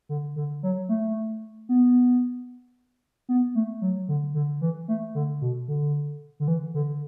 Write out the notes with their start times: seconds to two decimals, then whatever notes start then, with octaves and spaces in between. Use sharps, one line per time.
0.09 D3
0.36 D3
0.63 F#3
0.89 A3
1.69 B3
3.29 B3
3.55 A3
3.82 F#3
4.08 D3
4.34 D3
4.61 E3
4.88 A3
5.15 D3
5.42 B2
5.68 D3
6.40 D3
6.48 E3
6.74 D3